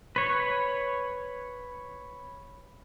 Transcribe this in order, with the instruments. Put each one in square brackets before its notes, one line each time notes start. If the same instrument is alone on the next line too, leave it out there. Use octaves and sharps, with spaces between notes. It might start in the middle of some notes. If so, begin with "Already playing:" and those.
[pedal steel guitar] B4 C#5